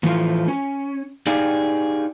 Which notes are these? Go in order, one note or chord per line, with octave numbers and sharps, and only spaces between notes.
A2 E3 F3 A3 F4
C#4
D#4 G4 G#4 D5 F5